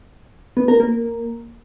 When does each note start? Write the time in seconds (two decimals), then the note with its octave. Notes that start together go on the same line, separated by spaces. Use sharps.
0.57 B3
0.68 A#4
0.80 A#3